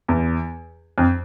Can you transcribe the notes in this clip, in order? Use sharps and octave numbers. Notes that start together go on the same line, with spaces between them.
E2
F2